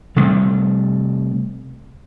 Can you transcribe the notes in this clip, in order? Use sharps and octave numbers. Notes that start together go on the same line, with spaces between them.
C3 G3 A3